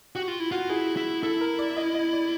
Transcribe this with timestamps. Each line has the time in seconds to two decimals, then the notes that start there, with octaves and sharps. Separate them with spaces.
0.15 F#4 G4
0.28 F4
0.40 E4
0.51 F4 F#4
0.69 E4 G#4
0.96 E4
1.23 E4 A4
1.41 A#4
1.59 D5
1.77 D#5
1.95 D#5
2.13 D5